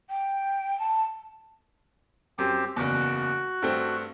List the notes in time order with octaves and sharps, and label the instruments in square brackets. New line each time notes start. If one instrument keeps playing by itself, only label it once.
[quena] G5
A5
[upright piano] F#2 [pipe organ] C4 G4
[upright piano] F#1 E2 [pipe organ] F#4
[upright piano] G2 A3 C4